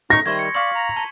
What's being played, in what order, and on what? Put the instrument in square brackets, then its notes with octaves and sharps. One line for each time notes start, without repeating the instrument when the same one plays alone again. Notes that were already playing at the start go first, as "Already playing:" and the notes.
[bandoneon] D#4 C#6 [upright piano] A#6
[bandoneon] D#3 G3 [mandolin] E4 C5 D#6 [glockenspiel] C6 C#6 G#6
[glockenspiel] C#7
[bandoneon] D5 [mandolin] F5 C#6 E6 [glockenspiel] B6 F#7
[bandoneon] A#5
[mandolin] A4 [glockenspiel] A5 D#7